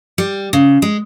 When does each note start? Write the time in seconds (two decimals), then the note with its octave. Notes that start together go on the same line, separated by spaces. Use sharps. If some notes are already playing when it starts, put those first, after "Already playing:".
0.18 G3
0.53 C#3
0.82 G#3